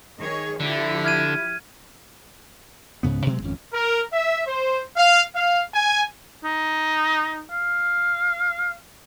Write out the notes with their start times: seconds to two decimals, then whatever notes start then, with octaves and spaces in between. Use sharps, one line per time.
0.19 D#3 G#4 C#5
0.60 D3 F3 E4 G4
1.05 F6 G#6 D#7
3.03 C#2 G#2 C#3 B3
3.26 B2 F#3 G#3 C4
3.42 G#1 F2 C#4
3.74 A#4
4.13 E5
4.48 C5
4.97 F5
5.36 F5
5.75 G#5
6.44 D#4
7.52 F5